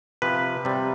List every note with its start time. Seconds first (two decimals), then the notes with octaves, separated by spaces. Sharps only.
0.22 C3 F3 B4
0.65 C3 G3